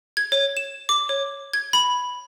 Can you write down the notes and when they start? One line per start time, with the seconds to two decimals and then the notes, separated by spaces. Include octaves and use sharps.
0.17 G#6
0.32 C#5
0.57 E7
0.89 D6
1.09 C#5
1.53 G#6
1.73 B5